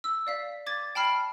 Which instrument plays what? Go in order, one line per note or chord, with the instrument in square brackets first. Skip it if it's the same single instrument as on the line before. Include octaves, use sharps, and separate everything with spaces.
[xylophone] E6
D5 F5 B6
D6 G#6 A6
G5 A5 B5 F6 C7